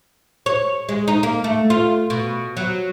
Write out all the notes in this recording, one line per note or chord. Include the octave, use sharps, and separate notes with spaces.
C#5
G#3
D#4
A#3
A3
F4
B2
F#3